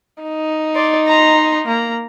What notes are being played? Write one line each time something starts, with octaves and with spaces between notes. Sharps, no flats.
D#4
D5 C6
A#5 C6
A#3 A#5